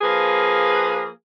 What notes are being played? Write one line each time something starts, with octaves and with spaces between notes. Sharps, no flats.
F3 A#3 G#4 B4